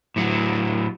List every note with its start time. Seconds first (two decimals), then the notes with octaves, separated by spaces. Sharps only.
0.16 A2 F#3